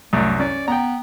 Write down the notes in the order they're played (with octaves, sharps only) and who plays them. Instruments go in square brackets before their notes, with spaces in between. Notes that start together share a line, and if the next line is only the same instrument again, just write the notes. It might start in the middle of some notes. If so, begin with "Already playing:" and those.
[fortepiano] C2 F#2 [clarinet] A3
[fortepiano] C#4 [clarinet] D5
[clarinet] B3 [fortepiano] G5 A#5